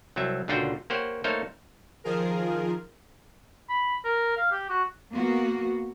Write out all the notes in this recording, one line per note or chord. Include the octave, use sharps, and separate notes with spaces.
C2 F#3 C4 E5
C#2 A#2 D3 F4 F#4 G5
A#3 G4 C5 C#5 F#5
A3 A#3 D#4 C5 C#5 F5
D#3 F3 F4 G#4 A#4
B5
A#4
F5
G4
F#4
A#3 B3 F#4